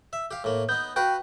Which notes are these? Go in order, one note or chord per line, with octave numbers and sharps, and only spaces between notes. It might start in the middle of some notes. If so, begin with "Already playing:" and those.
E5
G4 F5
A2 A#3
B3 D#4 G6
F#4 B4 F5 G5